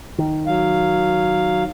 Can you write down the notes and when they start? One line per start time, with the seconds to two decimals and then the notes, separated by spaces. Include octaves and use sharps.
0.18 D#3
0.47 F#3 F5